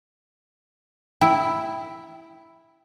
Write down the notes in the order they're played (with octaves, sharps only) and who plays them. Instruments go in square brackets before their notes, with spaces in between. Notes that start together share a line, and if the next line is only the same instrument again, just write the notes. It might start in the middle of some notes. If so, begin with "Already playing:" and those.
[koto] E4 [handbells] G5